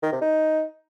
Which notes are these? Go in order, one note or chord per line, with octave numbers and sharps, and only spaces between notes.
D#3
C3
D#4